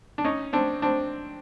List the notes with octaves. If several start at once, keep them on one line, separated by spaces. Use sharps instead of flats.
D4
C#4 D#4
C4 D4
C4 D4